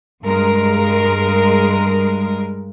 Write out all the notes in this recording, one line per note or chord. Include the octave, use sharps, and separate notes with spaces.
G2 G#3 A#4